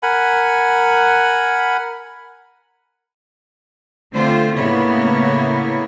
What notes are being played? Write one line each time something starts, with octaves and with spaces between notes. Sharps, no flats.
A#4 F#5 G#5 B5
D3 A3 C4 F4 C5
A2 C#3 A#3 B3 E4 C#5